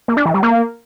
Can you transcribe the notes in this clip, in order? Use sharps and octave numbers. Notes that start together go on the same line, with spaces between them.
A#3
D4
E3
G3
A#3